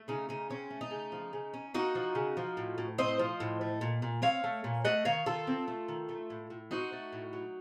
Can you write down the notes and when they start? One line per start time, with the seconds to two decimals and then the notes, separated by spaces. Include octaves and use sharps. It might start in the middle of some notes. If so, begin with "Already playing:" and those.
Already playing: A3
0.08 C#3 D#4
0.29 C#3 D#4
0.50 C4 C#4
0.70 A3
0.81 D#4
0.91 C#3
1.12 F3
1.33 C#3
1.54 C#4
1.74 A#3 D#4 F#4
1.95 F3
2.15 C#3
2.37 F3
2.57 A2
2.78 A2
2.98 C4 C5 D#5
3.19 F3
3.40 A2
3.61 A3
3.81 A#2
4.02 A#2
4.22 C4 C#5 F5
4.44 A3
4.64 A#2
4.85 A3 D#5 F#5
5.05 D#3 C#5 F5
5.26 D#3 F4 A4
5.47 C4
5.68 A3
5.88 D#3
6.09 A3
6.30 A2
6.50 A2
6.71 C4 D#4 F#4
6.92 A3
7.13 A2
7.33 F#3